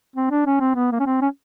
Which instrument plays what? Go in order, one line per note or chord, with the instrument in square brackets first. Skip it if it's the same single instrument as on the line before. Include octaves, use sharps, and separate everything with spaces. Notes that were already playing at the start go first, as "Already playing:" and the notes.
[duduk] C4
D4
C#4
C4
B3
A#3
C#4
C4
C#4